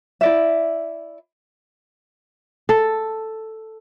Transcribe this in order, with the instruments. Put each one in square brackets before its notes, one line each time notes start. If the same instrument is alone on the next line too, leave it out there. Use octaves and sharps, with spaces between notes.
[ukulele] E4 D5 E5
[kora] A4